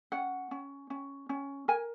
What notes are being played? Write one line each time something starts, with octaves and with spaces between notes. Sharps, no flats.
C#4 F#5
C#4
C#4
C#4
A#4 G#5